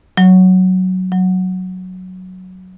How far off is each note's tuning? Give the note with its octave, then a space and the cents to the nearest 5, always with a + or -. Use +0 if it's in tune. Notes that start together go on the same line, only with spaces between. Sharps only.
F#3 +5
F#3 +0